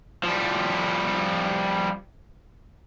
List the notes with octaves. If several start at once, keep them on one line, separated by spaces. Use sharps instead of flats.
F3 G3